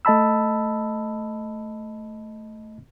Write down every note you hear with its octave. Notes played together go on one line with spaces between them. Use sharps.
A3 D#5 A5 B5 E6